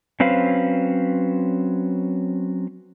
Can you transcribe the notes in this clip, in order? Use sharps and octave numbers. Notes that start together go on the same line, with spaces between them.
F#3 C4 C#4 B4 C5 F5